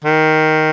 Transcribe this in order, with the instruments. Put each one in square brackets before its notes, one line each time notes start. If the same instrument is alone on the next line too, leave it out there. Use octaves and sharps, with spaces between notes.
[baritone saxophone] D#3